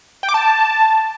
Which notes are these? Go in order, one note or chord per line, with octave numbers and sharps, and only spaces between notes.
G5
D6
A5